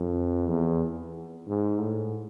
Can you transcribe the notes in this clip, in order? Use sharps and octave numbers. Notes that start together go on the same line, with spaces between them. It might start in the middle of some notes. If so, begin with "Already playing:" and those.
Already playing: F2
E2
G#2
A2